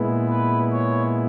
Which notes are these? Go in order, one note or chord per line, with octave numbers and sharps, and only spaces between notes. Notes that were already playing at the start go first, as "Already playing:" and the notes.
Already playing: A#2 G#3 B3 E4
B4
C#5